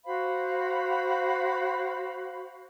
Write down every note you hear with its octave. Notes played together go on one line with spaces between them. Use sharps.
F#4 C5 F5 B5